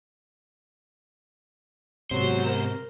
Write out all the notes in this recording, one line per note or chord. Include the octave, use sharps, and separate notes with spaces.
G#2 C3 F#3 B3 C5
A#4